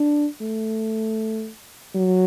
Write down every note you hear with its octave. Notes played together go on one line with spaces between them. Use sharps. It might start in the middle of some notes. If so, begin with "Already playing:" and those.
Already playing: D4
A3
F#3